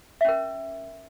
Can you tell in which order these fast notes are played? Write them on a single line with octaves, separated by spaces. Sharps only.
E5 C#4 A#4